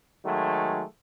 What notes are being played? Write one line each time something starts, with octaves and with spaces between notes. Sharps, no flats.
D#3 F#3 G#3 A3